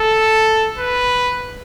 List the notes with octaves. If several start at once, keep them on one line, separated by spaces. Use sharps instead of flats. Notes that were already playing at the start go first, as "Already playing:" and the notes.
Already playing: A4
B4